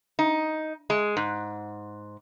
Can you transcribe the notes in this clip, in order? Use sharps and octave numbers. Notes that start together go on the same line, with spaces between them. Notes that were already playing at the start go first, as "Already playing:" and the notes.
D#4
G#3
G#2